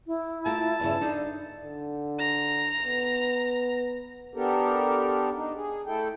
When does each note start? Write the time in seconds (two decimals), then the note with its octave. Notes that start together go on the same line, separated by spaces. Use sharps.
0.07 E4
0.46 A3 F4 A#4 A5
0.80 E2 G2 C#3
1.01 D4 D#4 A4
1.64 D3
2.19 A#5
2.85 B3
4.34 B3 D4 G4 A4 A#4
5.34 D4 D#4
5.55 G#4
5.86 A3 E4 A4 G5